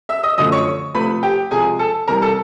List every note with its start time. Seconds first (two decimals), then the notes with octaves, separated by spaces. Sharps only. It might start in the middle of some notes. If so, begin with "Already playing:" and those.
0.09 E5 E6
0.23 D#5 D#6
0.38 F#2 D3 F3 A3 D#5 D#6
0.52 C#5 C#6
0.94 C3 F3 A3 B4 B5
1.23 G4 G5
1.51 C3 F3 G#3 G#4 G#5
1.79 A4 A5
2.08 C3 E3 G3 A#4 A#5
2.22 A4 A5